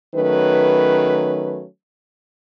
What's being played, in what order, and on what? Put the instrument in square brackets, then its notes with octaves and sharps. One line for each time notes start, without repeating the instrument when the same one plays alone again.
[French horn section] D#3 F#3 A3 C#4 B4